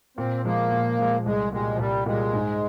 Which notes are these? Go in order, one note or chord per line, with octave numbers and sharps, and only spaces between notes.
A#2 C4
F3 G#3 A#3
A#2
F3 G#3
C2 G#3
A#2 G3 G#3
F3
C2 G3
A#2 G3 G#3
G#2